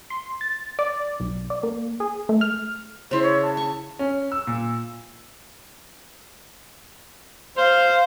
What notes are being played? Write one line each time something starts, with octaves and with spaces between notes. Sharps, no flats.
C6
A6
D5
B1
D5
A#3
G#4
A3
F6
C#3 E4 C5
C#5
A5
C#6
C#4
E6
A#2
C5 F5